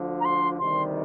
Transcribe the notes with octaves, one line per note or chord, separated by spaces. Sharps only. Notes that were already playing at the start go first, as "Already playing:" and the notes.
Already playing: D2 D3 F3
A#5
C6
D2 C3 D#3 G3 C6